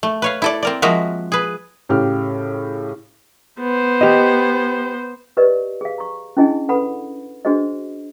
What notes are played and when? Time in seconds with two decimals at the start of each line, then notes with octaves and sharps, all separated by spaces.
0.03 A3
0.22 B4 C#5 F5
0.42 E4 A4 D5
0.63 C4 A#4 D5
0.82 F3 G#3 A#3 F#4 A#4 E5
1.32 G#4 B4
1.89 A2 C#3 G4 F6
3.60 B3 C5
4.01 G4 D#5
5.37 G4 A#4 B4 D5 D#5
5.81 G#4 F5
5.98 A#5 C#6
6.37 C#4 D4 E4 G#4 D#5 G#5
6.69 A4 B4 F#5 B5
7.45 D4 F#4 G#4 C5 D#5